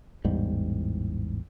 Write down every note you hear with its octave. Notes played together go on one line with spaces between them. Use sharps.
A1 E2 G#2 G3